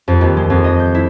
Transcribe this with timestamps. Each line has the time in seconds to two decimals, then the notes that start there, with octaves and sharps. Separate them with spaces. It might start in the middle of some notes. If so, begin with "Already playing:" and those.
0.08 F2
0.21 D#2
0.37 G#3
0.50 F2
0.64 D#5
0.79 G6
0.95 E4